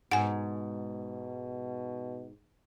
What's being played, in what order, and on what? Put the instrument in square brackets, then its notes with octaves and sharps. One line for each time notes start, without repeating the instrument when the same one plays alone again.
[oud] G#2 [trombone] B2 [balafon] F#5 G#5